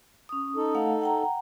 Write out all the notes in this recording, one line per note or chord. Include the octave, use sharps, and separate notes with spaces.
C#4 D#6
D#4 A4
A3 F5 F#5
F#5 G5 A#5